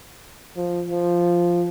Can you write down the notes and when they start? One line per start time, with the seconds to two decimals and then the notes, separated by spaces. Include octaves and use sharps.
0.56 F3
0.90 F3